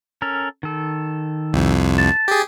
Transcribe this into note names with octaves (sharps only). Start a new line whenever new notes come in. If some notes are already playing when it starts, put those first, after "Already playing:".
C#4 A4 A#4
D#3 A4
C2 F2
A5
G4 G#4